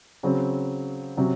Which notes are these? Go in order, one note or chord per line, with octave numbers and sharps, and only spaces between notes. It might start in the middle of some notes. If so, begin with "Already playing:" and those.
C#3 F#3 C4
C3 F#3 C#4